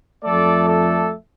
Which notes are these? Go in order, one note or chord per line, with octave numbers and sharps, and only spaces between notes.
F2 F3 A3 A4 D5
A4 D5